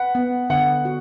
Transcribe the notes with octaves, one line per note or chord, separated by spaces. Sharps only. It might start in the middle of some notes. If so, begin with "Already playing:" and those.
Already playing: B4 F#5
B3
D3 F#5
F#4